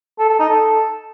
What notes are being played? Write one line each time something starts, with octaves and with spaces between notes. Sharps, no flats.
A4
A4
D#4
A4